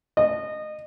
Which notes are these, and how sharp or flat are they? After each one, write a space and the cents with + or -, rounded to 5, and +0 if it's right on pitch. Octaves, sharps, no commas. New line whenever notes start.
D#5 -25